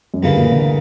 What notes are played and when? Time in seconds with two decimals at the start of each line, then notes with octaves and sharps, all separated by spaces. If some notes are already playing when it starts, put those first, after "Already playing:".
0.14 F#2
0.23 D2 G2 C#3 E3 A#3
0.37 A#2
0.52 D3